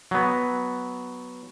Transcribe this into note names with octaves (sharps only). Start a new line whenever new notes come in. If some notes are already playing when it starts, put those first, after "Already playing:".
F#3 B3